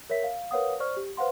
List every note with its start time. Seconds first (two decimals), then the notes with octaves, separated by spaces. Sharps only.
0.10 A#4 C#5 E5 B6
0.23 F5
0.51 A#4 B4 C#5 F5 F#5 D#6
0.80 C5 D5 C#6 F6
0.97 G4
1.17 B4 C5 F5 F#5 C6